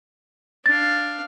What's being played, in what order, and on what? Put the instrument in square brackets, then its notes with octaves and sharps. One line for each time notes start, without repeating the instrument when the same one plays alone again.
[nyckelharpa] D4 F5 [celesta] A6